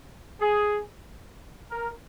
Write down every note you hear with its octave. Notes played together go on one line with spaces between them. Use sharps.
G#4
A#4